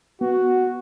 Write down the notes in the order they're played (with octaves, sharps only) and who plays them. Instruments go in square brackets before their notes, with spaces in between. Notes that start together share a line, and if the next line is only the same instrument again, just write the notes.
[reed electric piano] B3 [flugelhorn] F#4